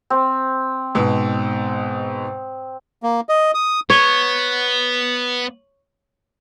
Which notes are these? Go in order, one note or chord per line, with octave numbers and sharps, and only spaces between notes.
C4
G#2 B2 E6
A#3
D#5
D#6
B3 C#5